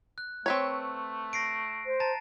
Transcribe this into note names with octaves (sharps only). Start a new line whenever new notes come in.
F#6
A3 C4 B4 C#5
A#6 C7 D7
C5
A5 A#5 A6